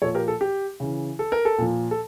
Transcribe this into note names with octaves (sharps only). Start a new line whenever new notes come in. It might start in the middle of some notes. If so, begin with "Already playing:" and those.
A#2 F3 A4 C#5
G4 A#4
A4
G4
C#3 E3
A4
A#4
A4
A#2 F3
A4